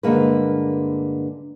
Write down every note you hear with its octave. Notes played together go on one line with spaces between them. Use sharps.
G2 D3 G#3 A#3 B4